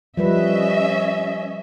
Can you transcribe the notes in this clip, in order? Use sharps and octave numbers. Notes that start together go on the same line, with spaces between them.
F3 G3 C#4 B4 D#5 E5